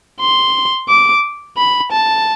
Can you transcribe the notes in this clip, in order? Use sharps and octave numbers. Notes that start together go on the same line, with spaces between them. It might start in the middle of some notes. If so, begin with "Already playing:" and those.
C6
D6
B5
A5